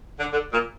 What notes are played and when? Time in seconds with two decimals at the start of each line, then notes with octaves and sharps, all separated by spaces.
0.20 D3
0.33 D3
0.52 A#2